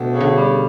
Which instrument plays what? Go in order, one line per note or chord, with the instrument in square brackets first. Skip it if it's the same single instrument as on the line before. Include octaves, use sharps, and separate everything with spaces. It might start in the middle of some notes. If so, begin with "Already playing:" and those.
Already playing: [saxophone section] D2 [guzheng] B2
[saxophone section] C#3
[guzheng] D3
[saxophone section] G3